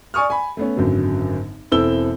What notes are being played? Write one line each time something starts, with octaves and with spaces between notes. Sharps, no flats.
D5 G#5 C#6 D#6 F6
G#5 B5
A3 B3 C#4
G#1 F#2 D3 F#3
E1 C4 E4 A4 E6 G7